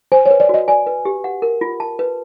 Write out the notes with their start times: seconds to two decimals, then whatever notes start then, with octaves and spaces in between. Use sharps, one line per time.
0.12 C5 G#5
0.26 C#5
0.31 B4
0.40 D5
0.49 F#4 D#5
0.68 D5 G#5
0.87 B4
1.05 G4
1.24 F#5
1.42 A#4
1.61 F4
1.80 A5
1.99 B4